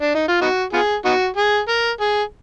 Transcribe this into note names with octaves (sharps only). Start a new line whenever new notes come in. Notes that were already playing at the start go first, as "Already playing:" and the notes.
D4
D#4
F4
B3 D#4 F#4
B3 F4 G#4
B3 D#4 F#4
G#4
A#4
G#4